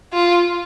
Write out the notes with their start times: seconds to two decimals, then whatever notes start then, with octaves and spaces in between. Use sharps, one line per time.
0.13 F4